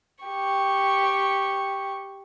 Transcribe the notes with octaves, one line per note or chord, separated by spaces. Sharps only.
G4 C#6